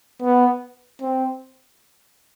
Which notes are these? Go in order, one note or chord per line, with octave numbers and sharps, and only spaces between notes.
B3
C4